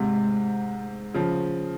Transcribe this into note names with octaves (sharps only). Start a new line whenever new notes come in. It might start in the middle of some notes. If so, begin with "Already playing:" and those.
Already playing: G#2 C3
C#3 F3